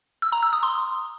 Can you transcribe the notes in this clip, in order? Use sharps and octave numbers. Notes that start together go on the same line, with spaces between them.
E6
A#5
E6
D#6
C6